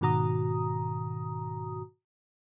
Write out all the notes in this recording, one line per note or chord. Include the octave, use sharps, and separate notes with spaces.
G#2 B2 D#3 F#4 A#5 D#6